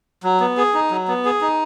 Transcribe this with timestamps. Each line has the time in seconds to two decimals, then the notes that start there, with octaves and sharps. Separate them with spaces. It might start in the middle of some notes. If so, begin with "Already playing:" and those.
0.23 F#3
0.40 B3
0.57 G#4
0.74 D#4
0.91 F#3
1.08 B3
1.25 G#4
1.41 D#4